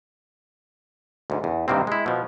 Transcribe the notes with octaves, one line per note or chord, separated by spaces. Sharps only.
D2 G#2
E2
G2 C3 D#3 A#3 C4
G#3 E4
B2 F3